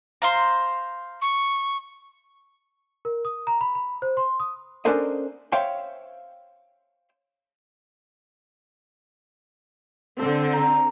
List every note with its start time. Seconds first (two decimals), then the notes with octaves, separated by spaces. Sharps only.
0.22 C5 F5 A#5
1.22 C#6
3.05 A#4
3.25 D#6
3.47 A#5
3.61 B5
3.75 B5
4.02 C5
4.17 C6
4.40 D#6
4.85 C#4 D4 A4 A#4 C5 D#5
5.52 C5 C#5 E5 F5 G5 C6
10.19 D3 C4 A4
10.53 A#5